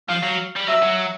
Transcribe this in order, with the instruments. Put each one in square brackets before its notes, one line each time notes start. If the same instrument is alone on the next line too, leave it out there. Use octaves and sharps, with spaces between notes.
[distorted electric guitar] F3 [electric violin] F5
[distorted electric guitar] F#3
G3
[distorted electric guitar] F#3 [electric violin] E5
[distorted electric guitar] F#3